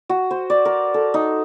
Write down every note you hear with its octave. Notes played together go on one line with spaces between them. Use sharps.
F#4
C5
D5
A#4
A4
D#4